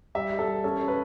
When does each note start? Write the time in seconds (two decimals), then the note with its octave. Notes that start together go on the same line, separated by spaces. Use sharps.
0.15 G3 E5
0.31 G3
0.39 A4
0.47 G3
0.64 C#4 A4
0.80 C#4
0.88 B4